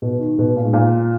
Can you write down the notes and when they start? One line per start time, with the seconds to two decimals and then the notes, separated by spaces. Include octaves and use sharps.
0.02 B2
0.19 D#3
0.38 B2
0.56 A#2
0.65 G#2
0.73 A#2